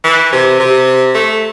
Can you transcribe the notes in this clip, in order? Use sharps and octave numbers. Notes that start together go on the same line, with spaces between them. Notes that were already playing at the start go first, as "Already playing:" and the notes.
E3
C3
C3
A3